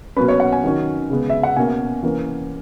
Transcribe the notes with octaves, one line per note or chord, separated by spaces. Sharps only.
B2 F#3 A#3 C#4 B4
C#5
F#5
G#5
D#3 F#3 C#4
C#3 G#3 B3
E5
F#5
B2 A#3 C#4 G#5
E3 A#3 C#4